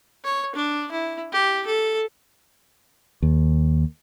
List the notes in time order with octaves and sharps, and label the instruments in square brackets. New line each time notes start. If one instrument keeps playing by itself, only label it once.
[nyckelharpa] C#5
D4
E4
G4
A4
[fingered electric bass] D#2